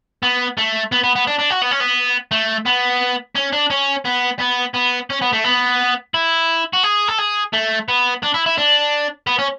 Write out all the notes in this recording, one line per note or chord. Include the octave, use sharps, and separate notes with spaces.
B3
A3
B3
B3
B3
D4
D4
F#4
B3
C#4
B3
A3
B3
C#4
D4
C#4
B3
B3
B3
C#4
B3
A3
B3
E4
F#4
G#4
A4
G#4
A3
B3
D4
E4
E4
D4
B3
C#4